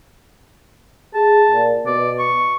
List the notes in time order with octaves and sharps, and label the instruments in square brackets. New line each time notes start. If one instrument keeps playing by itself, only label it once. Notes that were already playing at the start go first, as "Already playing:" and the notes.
[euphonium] G#4 [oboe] A5
[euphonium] A#2
[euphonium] B2 [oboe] D5
[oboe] C#6